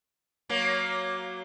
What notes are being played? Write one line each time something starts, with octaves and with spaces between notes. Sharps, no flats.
F#3 A#3